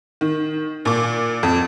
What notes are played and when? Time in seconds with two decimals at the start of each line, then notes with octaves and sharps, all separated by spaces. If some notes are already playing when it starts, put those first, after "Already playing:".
0.21 D#3
0.85 A#2 D6
1.43 F2